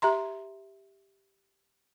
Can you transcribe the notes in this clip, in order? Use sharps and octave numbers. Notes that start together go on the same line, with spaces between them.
G4 E5 A#5 C6